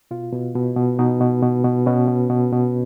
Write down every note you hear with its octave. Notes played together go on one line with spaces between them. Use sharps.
B2 F4
B2
B2
B2
B2 D#4
B2
B2
B2
B2 C#4
B2
B2
B2